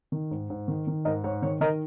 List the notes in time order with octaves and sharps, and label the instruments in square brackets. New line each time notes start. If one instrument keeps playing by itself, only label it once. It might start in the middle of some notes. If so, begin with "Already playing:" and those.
[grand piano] D#3
G#2
G#2
D#3
D#3
G#2 A#4 D#5
G#2 C#5
D#3 C#5
D#3 A#4 D#5